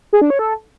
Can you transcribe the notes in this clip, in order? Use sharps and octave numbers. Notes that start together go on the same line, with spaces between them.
G#4
D4
C#5
A4